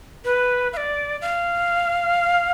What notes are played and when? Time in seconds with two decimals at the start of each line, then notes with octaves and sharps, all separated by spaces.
0.25 B4
0.73 F5
0.77 D5
1.22 F5